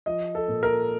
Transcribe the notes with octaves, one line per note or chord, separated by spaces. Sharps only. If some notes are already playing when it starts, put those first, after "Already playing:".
F3 D#5
A4
A#2
A#4